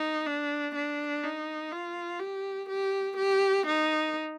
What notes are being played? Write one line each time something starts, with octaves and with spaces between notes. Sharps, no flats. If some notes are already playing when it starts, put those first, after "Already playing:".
Already playing: D#4
D4
D4
D#4
F4
G4
G4
G4
D#4